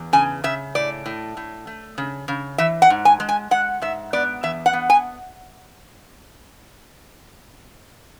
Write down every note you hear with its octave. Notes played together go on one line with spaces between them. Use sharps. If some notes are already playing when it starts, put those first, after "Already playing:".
Already playing: E2
C#3 G#5
C#3 E5
A2 D5
A2
A2
A3
C#3
C#3
E3 E5
F#5
G#2
G#5
G#3
G#5
G#3 F#5
G#2 E5
B3 D5
E2 E5
F#5
B3
G#5